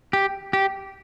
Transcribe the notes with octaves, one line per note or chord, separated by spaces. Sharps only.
G4
G4